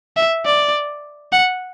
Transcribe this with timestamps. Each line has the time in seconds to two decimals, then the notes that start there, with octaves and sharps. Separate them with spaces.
0.17 E5
0.46 D5
1.32 F#5